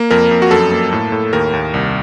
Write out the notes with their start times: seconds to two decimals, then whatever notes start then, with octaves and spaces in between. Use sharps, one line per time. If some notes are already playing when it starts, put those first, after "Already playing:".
Already playing: A#3
0.11 F2 A#4
0.31 F2
0.42 F#4
0.51 F#2 A4
0.72 A#3
0.93 A2
1.12 A2
1.33 D#2 A#4
1.53 D#2
1.74 C2